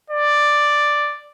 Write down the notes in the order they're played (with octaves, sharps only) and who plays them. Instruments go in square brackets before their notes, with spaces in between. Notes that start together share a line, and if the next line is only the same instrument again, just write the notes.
[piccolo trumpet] D5